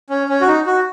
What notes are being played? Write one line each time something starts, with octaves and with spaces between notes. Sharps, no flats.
C#4
C#4
F#4
D#4
F#4